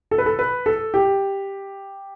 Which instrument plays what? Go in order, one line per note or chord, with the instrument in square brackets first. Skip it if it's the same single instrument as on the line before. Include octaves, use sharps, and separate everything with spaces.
[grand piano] A4
B4
A4
B4
A4
G4